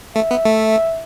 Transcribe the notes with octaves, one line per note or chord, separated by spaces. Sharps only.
A3 E5
B3
A3